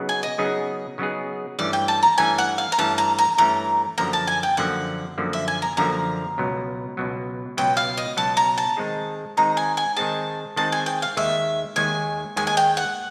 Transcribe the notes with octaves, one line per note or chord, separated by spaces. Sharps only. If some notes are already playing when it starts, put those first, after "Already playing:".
Already playing: C#3 F#3 B3 D#4 G#4
G#5
D#5
C#3 F#3 B3 D#4 G#4
C#3 F#3 B3 D#4 G#4
G2 E3 A3 C#4 D5
G5
A5
A#5
G2 E3 A3 C#4 G#5
F#5
F5
A#5
G2 E3 A3 C#4 A5
A#5
A#5
G2 E3 A3 C#4 A#5
F#2 D3 F3 A#3 A#5
A5
G#5
G5
F#2 D3 F3 A#3 F#5
F#2 D3 F3 A#3
E5
G#5
A#5
F#2 D3 F3 A#3 A#5
C#2 B2 F#3
C#2 B2 F#3
C#2 B2 F#3 G5
F5
D#5
C#2 B2 F#3 A5
A#5
A5
D#3 G#3 C4 D#4 G#4
D#3 G#3 C4 D#4 G#4 A#5
G#5
G#5
D#3 G#3 C4 D#4 G#4 A5
D#3 G#3 C4 D#4 G#4 A5
G#5
G5
F5
D#2 D#3 G#3 E5
D#2 D#3 G#3 G#5
D#2 D#3 G#3 G#5
G#5
G5
F#5